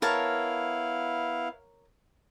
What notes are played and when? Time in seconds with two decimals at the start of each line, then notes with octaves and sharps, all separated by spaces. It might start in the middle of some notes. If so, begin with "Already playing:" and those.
0.02 B3 E4 A#4 C#5 F5 A5